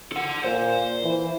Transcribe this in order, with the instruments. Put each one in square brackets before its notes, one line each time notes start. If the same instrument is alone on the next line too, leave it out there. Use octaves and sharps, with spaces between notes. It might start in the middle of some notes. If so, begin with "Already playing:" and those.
[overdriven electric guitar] A4 F#5
[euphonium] A#2 [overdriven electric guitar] C5
[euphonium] E3